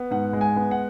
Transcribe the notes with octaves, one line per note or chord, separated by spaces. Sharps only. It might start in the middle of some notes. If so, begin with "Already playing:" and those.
Already playing: B3
G#2 F#5
G#3
G#5
B3
F#5